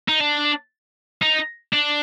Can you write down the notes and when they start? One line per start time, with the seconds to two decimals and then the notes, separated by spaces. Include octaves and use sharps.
0.08 D#4
0.20 D4
1.22 D#4
1.73 D4